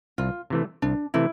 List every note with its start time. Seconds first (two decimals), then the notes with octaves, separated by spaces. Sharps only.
0.18 C2 F4
0.50 C3 E3 A3
0.82 C2 D4
1.14 C3 E3 A3 E4